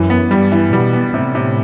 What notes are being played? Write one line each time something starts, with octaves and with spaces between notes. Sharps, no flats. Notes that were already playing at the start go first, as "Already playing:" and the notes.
Already playing: F#2 E3
B3
G2 G3
E3
B2 G3
B3
A2 C3
C3